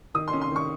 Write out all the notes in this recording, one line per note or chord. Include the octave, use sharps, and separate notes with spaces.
D#3 D#6
C6
C#4
C6
D#3 C#6